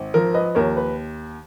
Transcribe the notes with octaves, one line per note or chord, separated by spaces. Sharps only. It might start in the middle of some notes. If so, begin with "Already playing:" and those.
Already playing: G#1
F3 A#4
B4 D#5
D#2 A#4 C#5
B4